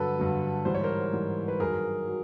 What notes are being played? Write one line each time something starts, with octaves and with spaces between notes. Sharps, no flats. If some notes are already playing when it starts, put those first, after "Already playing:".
Already playing: G2 D3 F#3 A4 B4
G2 D3 F#3
G#2 E3 G3 C5
C#5
A#4 C5
G#2 E3 G3
B4
G2 D#3 F#3 G#4 A#4
F#3